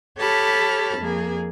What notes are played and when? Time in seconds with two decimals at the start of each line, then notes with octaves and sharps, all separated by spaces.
0.18 G4 A4 C#5 A5 B5 F6
0.97 F2 A#3 G#4